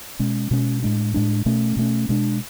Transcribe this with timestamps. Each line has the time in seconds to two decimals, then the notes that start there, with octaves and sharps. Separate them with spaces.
0.19 B2 G#3 C#4
0.51 B2 G#3 C#4
0.83 A2 G#3 D4
1.14 A2 G#3 D4
1.46 B2 A3 C#4
1.77 B2 A3 C#4
2.09 B2 G#3 D4